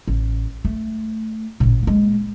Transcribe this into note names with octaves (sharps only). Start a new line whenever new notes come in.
A1
A3
A1 A#2
G#3 A#3